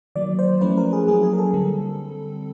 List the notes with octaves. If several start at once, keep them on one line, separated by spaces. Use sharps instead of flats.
D#3 F#3 A#3 D5
C5
F3 A3 C#4 E4 B4
A#4
G#4
F#3 A#3 C#4 E4 G#4
G#4
A#4
A4
D3 G3 C4